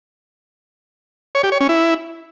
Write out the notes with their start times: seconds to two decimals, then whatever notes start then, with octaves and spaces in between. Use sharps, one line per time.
1.35 C#5
1.43 G4
1.52 C#5
1.60 C#4
1.69 E4